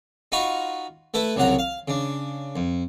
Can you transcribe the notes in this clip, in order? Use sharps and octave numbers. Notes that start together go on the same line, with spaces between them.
D#4 F4 F#4 A#5 B5 C#6
A3 E4 A4 B4
C2 C#3 F#3 F#5 A#5
F5
C#3 D4
F2